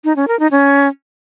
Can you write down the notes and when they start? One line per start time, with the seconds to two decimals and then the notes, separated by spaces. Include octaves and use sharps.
0.04 D#4
0.16 C#4
0.28 A#4
0.39 D#4
0.51 C#4